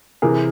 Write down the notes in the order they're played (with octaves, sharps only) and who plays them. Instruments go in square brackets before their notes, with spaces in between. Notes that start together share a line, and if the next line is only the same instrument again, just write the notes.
[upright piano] C3 E3 G#4 A#4